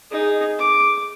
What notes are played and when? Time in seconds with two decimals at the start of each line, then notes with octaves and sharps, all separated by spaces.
0.11 D#4 G#4
0.59 D6